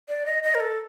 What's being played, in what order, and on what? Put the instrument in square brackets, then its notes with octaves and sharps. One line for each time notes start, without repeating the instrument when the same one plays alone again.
[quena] D5
D#5
D#5
A#4
A4